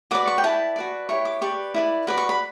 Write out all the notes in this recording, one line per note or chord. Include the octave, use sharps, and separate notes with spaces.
F#4 B4 D5 D6
C#6
G5
E4 B4 D5 A5
F#4 B4 D5
E4 G4 C#5 C#6
D6
G4 B4 D5 C#6
E4 B4 D5
F#4 B4 D5 B5
C#6
B5